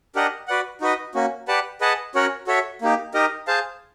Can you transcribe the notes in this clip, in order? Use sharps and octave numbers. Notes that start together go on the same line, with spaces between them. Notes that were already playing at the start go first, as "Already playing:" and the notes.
D4 G4 A#4 D#5 F#5
F#4 B4 D5 F#5
D#4 F#4 B4 D#5
A#3 C#4 F#4
G4 B4 D5 F#5 A5
G#4 B4 D#5 F#5 A5
C#4 F#4 A#4 C#5 F#5
F#4 A4 C#5 E5
A#3 D#4 G4
D#4 G4 A#4 D#5
G#4 C5 F5 A5